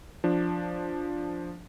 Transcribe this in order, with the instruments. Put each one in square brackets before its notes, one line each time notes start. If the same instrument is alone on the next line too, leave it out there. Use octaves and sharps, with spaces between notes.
[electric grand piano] F3 D4